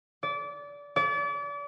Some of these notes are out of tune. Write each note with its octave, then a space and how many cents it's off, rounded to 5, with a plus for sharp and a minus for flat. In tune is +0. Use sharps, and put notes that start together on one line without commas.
D5 -25
D5 -35